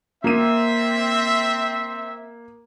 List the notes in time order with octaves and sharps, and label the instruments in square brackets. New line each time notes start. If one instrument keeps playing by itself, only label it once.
[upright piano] A#3 D#7 [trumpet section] C4 E5